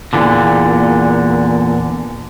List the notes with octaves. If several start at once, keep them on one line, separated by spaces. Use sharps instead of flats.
E2 A#2 D3